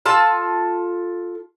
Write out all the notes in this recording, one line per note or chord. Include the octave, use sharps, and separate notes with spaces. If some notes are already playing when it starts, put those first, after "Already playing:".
F4 A4 A5